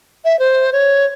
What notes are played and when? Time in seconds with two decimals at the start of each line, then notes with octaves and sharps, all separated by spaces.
0.25 E5
0.39 C5
0.73 C#5